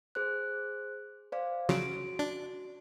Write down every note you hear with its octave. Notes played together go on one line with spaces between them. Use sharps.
G#4 C5 F#6
C5 D5 F5
C#3 F3 F#3 F#4 D7
D4